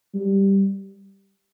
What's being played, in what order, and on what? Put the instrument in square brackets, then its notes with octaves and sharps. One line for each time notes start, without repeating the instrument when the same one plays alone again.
[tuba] G3